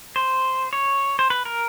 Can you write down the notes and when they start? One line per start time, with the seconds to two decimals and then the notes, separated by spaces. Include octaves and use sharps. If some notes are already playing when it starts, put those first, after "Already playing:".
0.16 C5
0.73 C#5
1.19 C5
1.30 B4
1.45 A#4